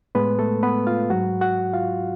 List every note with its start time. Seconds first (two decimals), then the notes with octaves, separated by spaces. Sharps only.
0.15 A2 G#3 B3 B4
0.39 A3 A4
0.63 B3 B4
0.87 F4 F5
1.10 G#2 F#3 F#4 F#5
1.41 F#4 F#5
1.74 F4 F5